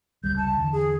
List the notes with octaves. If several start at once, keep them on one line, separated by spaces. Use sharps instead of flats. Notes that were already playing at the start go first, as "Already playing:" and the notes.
F1 C#2 G3 G6
A5
E2 D3
G#4